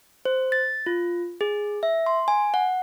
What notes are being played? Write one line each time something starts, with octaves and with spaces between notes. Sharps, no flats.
C5
A6
F4
G#4
E5
C6
G#5
F#5